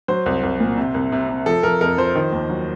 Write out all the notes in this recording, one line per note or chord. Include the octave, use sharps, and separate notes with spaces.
F#3 C5
C2
C2
A#2
C3
C2
C3
C3
F3 A4
F3 A#4
F2 A#4
F3 C5
D#3
D#2
F#3